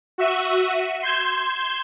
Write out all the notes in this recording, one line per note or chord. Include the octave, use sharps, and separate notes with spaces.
F#4 E5 D#7
C6 G6 G#6 E7